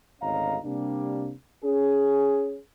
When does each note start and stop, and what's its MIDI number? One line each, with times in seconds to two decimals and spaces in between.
0.22 0.58 32
0.22 0.58 38
0.22 0.58 61
0.22 0.58 75
0.22 0.58 77
0.22 0.58 82
0.65 1.32 48
0.65 1.32 55
0.65 1.32 58
0.65 1.32 62
1.64 2.60 61
1.64 2.60 68